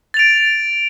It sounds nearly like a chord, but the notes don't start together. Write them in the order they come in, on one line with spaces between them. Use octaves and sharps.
A6 F7 D7